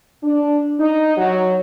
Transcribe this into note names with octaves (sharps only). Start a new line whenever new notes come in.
D4
D#4
F#3